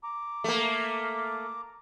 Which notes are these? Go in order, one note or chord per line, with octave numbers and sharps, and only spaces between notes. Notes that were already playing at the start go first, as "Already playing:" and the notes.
A#5 D6
A3 A#3